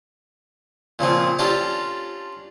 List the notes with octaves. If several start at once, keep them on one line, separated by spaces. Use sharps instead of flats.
A#2 C#3 F3 C4
C#4 D4 F4 G4 A4 A#4